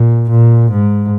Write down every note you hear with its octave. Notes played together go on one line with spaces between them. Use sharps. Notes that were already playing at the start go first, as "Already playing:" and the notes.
Already playing: A#2
A#2
G#2